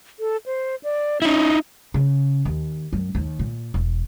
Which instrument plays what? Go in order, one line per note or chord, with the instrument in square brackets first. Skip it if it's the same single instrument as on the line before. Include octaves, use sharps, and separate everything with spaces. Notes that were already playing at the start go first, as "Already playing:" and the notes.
[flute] A4
C5
D5
[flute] C#4 [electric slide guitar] D#4 E4
[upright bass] C#3
D#2
F#2
D#2
A#2
E1